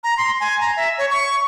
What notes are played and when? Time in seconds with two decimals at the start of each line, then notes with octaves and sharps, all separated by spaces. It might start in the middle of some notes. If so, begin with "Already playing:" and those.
0.04 A#5
0.18 C6
0.40 G#5
0.61 A#5
0.77 E5
0.98 C#5
1.11 C#6